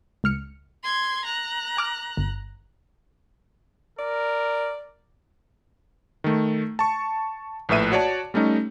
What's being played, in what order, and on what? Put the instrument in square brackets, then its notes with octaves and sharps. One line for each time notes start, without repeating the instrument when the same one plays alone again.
[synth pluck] C#2 F6 C#7
[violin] C6 G#6
A#5 F#6
[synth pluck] G#5 D6 F6
G1
[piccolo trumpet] A#4 [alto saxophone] D5
[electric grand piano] D#3 A3
A5 C#6
A#1 A2 B4 E5 D#7
F#4 C#5 D5 A5
G3 A3 C#4 D#4